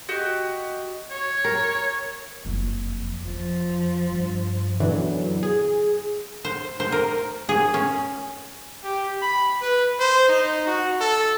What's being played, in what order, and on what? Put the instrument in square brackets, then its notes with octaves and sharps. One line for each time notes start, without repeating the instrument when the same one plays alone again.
[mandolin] F#4 G4 D#5
[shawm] C#5
[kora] A#4
[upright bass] F#1 F2
[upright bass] F2 [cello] F3
[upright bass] G2
[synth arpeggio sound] F#2 B2 D3 E3 F#3
G#4
[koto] C5
C5
A#4
G#4
C#4
[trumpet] G4
B5
B4
C5
D#4
F#4
A4